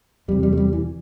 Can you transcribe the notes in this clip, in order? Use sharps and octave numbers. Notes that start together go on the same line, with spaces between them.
E2 C3 G3
G3
A3
G3
E3